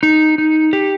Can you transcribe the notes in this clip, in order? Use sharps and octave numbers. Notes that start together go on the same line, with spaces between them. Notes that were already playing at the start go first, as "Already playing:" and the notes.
D#4
D#4
G4